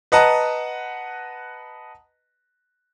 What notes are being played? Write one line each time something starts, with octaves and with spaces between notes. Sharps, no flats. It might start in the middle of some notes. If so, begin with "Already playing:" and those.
B4 D#5 F#5 A5 A#5